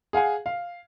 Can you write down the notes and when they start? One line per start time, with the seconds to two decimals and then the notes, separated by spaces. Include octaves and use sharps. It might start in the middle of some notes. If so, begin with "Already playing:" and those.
0.13 G#4 F5 F#5 G#5
0.46 F5